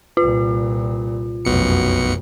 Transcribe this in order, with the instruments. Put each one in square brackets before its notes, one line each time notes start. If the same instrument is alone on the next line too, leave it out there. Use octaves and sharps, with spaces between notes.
[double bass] C2 A#2 [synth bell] F4
[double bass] F1 F#2 [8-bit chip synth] B1 B2 C#7